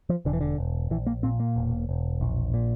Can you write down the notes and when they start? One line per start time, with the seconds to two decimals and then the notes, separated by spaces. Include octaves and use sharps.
0.09 F3
0.25 E1 D3
0.33 E3
0.41 D3
0.58 E1
0.90 A#1 E3
1.06 A#3
1.23 A#2 C4
1.40 A#3
1.56 E1
1.89 E1
2.21 A#1
2.54 A#2